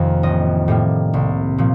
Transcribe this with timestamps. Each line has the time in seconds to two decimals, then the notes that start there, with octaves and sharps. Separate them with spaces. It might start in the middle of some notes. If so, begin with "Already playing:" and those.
Already playing: F1 F2 D#3 A#3
0.23 A1 D#5
0.68 A2 G3 A#3
1.14 C2
1.58 A#2 F3